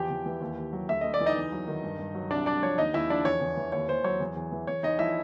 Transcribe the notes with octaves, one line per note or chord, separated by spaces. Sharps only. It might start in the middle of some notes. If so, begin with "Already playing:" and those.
Already playing: E2 F3 G4 G5
E2
E3
D#2
D#2
F#3
D2 E5
D2 D#5
D5
E3
D#4 D#5
E2
F#3
D#3
G2
G2
F#3
C2 D4 D5
C2 D4 D5
F3 C#5
D#2 D#4 D#5
D#2 E4 E5
F3 D4 D5
E2 C#5
E2
E3
D#2 C#5
D#2 C5
F#3 C#5
E2
E2
E3
E2 C#5
E2 D#4 D#5
F3 E4 E5